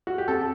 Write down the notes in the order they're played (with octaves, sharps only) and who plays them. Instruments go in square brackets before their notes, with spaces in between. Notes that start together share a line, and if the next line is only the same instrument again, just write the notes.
[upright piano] F#4
G4
[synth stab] C4 [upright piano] A4